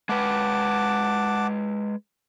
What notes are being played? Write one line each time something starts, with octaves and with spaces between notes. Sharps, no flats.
G#3 B4 F#5 A5 D6